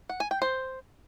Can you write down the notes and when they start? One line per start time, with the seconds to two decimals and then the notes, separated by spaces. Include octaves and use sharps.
0.09 F#5
0.20 G#5
0.31 G5
0.42 C5